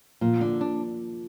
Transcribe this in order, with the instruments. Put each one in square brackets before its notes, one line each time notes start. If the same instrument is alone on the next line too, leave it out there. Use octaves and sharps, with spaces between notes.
[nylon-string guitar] A#2 [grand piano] F3
[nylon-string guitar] D3 [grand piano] A#3
[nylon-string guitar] D4